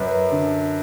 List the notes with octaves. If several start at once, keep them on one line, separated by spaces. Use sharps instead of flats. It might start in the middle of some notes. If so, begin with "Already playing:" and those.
Already playing: F#2 B4
D3